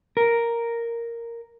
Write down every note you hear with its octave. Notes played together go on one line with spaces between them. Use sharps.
A#4